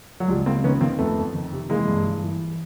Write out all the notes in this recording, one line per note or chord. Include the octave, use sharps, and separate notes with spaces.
F#3
C#2 F3 G3
C#2 A#3 C4
D#3 B3 C#4
D#3 A#3 C4
F2 A3 B3
F2
D#3
C3
E3 G#3 A#3
G2
E3
E3